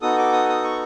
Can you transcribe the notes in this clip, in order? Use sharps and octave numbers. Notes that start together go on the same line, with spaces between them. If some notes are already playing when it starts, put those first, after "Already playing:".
B3 D#4 F#4 A4 D#6
D6
D#6
D#6
C#6